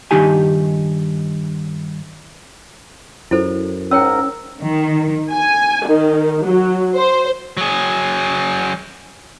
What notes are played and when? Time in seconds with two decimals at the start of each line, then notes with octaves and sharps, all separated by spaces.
0.11 G2 D#3 D#4 G4 G#5
3.31 F#2 E4 A4 C5
3.91 G#2 C#4 A#4 C#5 G5 E6
4.61 D#3
5.32 G#5
5.87 D#3
6.45 F#3
6.96 C5
7.57 F#3 G#4